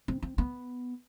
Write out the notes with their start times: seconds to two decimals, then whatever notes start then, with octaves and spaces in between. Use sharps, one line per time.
0.08 C4
0.23 C4
0.38 B3